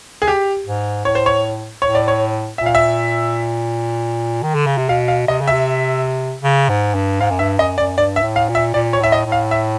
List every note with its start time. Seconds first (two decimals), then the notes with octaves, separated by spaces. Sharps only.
0.22 G#4
0.28 G4
0.67 G#2
1.05 A2 C#5
1.15 C5
1.26 C#5
1.82 A2 C#5
1.95 D5
2.08 C#5
2.58 A#2 E5
2.66 F5
2.75 E5
4.42 D#3
4.55 D3
4.66 C#3
4.78 C3
4.89 B2 F5
5.08 F5
5.28 C3 D#5
5.41 C#3
5.48 C3 E5
6.43 C#3
6.69 G#2
6.95 G2
7.21 G#2 F5
7.31 F#2
7.39 G2 E5
7.59 F#2 D#5
7.78 F#2 D5
7.97 G2 D5
8.16 E5
8.23 A2
8.36 F5
8.49 A#2
8.55 E5
8.74 A#2 D5
8.93 C#5
9.00 A2 E5
9.12 D#5
9.26 A2
9.32 F5
9.51 E5